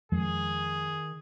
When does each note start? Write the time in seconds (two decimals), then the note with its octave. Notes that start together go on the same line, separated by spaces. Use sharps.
0.12 F2 D#3 F3 G#3 G#4